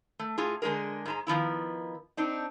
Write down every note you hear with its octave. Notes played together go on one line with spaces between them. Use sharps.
A3
A2 F4 G#4
D3 G#3 D4 G#4 A#4
G#2 G#3 A#5
D#3 F3 B3 E4
C4 D4 D#4